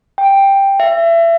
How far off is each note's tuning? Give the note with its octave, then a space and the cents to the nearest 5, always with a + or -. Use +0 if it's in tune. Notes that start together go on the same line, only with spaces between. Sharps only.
G5 +5
E5 +25